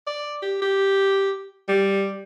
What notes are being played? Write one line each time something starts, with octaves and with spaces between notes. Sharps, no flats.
D5
G4
G4
G3